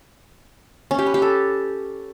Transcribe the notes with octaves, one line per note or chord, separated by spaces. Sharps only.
C#4
G4
B4
G4
A4